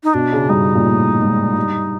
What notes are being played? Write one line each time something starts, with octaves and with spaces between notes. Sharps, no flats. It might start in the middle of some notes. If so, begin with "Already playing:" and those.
D#4
B2 D4
C#3
G2 D#4
A#2
A2
G#2
G2